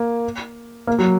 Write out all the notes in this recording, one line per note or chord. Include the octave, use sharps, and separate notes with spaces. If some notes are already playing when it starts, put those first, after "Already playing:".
Already playing: A#3
A#3
F#3